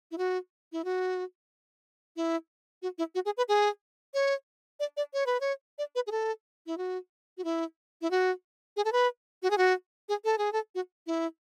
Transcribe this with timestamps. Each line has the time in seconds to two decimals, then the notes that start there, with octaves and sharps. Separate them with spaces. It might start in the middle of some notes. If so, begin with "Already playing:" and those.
0.11 E4
0.18 F#4
0.72 E4
0.84 F#4
2.16 E4
2.82 F#4
2.98 E4
3.15 F#4
3.25 G#4
3.37 B4
3.48 G#4
4.14 C#5
4.80 D5
4.97 D5
5.13 C#5
5.26 B4
5.40 C#5
5.78 D5
5.95 B4
6.07 G#4
6.11 A4
6.66 E4
6.77 F#4
7.37 F#4
7.44 E4
8.01 E4
8.11 F#4
8.76 G#4
8.85 A4
8.92 B4
9.42 F#4
9.50 G#4
9.58 F#4
10.09 G#4
10.24 A4
10.38 G#4
10.52 A4
10.75 F#4
11.06 E4